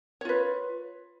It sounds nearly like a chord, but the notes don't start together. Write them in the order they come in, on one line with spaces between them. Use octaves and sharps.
C#5 F4 B4